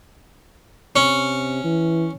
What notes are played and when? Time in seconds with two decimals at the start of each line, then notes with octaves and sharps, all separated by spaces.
0.96 C3 C#4
1.64 E3